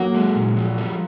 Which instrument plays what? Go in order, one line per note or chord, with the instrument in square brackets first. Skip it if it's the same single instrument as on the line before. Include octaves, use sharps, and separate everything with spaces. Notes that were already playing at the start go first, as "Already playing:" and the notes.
Already playing: [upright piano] F#3 [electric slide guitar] A#3
[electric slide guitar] G#3
A#2
F3
G3